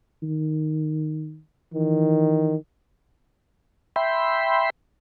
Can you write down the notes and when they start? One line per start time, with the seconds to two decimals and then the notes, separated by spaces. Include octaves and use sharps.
0.23 D#3
1.74 D#3 E3
3.96 E5 G5 B5 C6